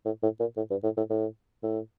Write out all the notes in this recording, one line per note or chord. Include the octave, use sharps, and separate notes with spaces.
A2
A2
A#2
A2
G2
A2
A2
A2
A2